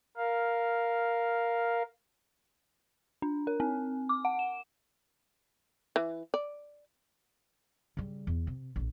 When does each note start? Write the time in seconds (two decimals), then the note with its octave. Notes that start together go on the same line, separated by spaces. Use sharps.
0.17 A#4 F5
3.22 D4
3.47 A#4
3.60 C4
4.09 D6
4.25 F#5
4.39 E7
5.96 E3
6.34 D5
7.97 C#3 G3
8.27 E2
8.47 C3
8.76 A#1 A2